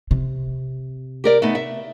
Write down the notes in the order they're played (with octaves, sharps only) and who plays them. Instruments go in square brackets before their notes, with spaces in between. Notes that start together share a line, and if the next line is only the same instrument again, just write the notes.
[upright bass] C3
[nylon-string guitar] G4 A#4 D5
A3 B3 D#4
E5